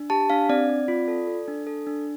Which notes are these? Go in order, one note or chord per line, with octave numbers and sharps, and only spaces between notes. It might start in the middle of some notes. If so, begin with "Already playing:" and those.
Already playing: D4
G4 A5
D4 F5
C4 D5
C4
F4
A4
A4
D4
A4
D4